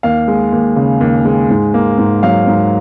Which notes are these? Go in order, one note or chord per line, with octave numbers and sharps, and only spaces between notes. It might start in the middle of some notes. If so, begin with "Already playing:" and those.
D#2 F5
G#3
D#2
C#3
D#2
G#3
G#2
A#3
G#2
F#3 F5
G#2